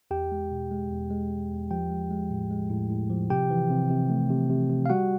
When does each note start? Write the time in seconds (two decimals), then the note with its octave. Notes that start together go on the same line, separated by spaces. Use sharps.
0.11 E2 G4 G5
0.32 G#3
0.51 B2
0.71 G#3
0.91 E2
1.10 G#3
1.31 G#3
1.51 E2
1.71 F3 G4 G5
1.90 G#3
2.11 G#3
2.31 A2
2.51 G#3
2.70 A2
2.90 A2
3.10 F3
3.30 C3 G4 G5
3.50 E3
3.70 C3
3.90 C3
4.10 A3
4.30 C3
4.50 C3
4.70 C3
4.86 F5
4.90 G3 F#4 F#5